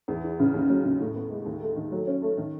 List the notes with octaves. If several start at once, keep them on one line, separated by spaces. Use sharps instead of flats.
E2
E3
C#3
D#2
F#3
C#3
A2
B3
G#3
D#2
A3
D#3
F#3
C#4
A3
D#3